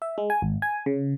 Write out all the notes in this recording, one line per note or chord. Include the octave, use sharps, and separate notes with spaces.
E5
G#3
G#5
G#1
G#5
C#3